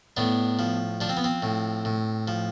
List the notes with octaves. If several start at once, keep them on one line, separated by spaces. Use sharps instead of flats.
A2 B3 D4
F3
F3 D4
C4
B3
C4
A2
A2
F3